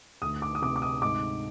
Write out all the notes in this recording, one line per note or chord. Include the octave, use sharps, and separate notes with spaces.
D2 D#6
D6
D#6
C3 D6
D6
D#6
G#2 D6